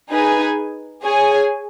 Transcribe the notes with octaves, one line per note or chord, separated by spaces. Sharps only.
D#4 G#4 B4 G#5
G#4 C#5 G#5